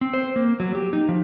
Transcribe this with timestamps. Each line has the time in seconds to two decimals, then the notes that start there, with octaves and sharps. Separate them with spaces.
0.01 C4
0.14 C5
0.36 A#3
0.60 F#3
0.75 G4
0.93 D#4
1.09 F3